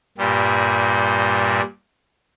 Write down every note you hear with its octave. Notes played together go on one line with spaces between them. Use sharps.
G2 A#2 G3